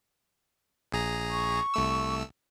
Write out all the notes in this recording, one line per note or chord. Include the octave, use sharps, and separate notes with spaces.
A#1 G#4 A#5
C#6
C2 A3 E6